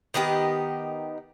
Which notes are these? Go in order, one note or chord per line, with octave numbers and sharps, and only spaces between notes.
D#3 B3 D#4 G4